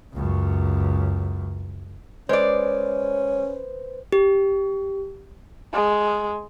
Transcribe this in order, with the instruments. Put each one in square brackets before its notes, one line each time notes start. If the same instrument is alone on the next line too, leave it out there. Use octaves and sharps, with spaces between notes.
[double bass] C#2 F#2
[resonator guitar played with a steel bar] G#3 D5 [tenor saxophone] C#4 [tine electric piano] B4 C5
[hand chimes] G4
[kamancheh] G#3